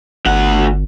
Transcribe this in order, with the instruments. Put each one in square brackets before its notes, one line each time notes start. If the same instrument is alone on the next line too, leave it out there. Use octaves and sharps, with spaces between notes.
[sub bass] G1 [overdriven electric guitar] D2 F#5